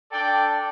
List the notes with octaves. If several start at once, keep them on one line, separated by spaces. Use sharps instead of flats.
D4 A4 D5 G5